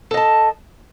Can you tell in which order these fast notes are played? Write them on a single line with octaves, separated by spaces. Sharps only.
A4 D#5 A5